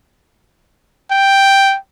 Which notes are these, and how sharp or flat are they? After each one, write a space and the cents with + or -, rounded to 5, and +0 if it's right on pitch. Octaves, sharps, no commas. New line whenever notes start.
G5 +0